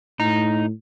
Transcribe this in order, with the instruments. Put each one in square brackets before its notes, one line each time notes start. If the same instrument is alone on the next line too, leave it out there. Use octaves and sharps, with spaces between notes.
[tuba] A2 [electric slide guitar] D#4